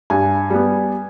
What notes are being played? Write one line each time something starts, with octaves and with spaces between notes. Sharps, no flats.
G2 G#5
G3 B3